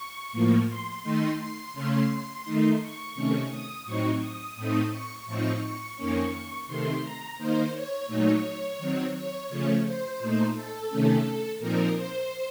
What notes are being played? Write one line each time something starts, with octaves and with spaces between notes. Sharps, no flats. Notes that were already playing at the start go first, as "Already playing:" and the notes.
Already playing: C#6
A2 F3 A#3
C6
D#3 A3 D#4
C6
C#3 A3 C#4 C6
D#3 A3 D#4
C#6
C3 D#3 A3 C#4
D#6
A2 F#3 C4 D#4 C#6
D#6
A2 A3 C4 D#4
C#6
A2 F3 C4 D#4 C#6
C#6
F2 D#3 A#3 C#4
C3 D#3 A3 C6
A#5
D#3 A#3 D#4 C5
C#5
A#2 F#3 A3 D#4 C#5
D#3 F#3 C4
C#5
C#3 F3 A3 C#4
C5
A#2 A3 D#4
A4
C3 D#3 A3 C#4
A#2 F3 C4 D#4 A#4
C5